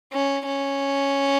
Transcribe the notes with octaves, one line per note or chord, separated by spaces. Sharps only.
C#4
C#4